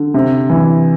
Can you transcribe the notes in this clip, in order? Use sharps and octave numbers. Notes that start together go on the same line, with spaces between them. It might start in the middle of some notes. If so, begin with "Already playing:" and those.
Already playing: D3
C3
E3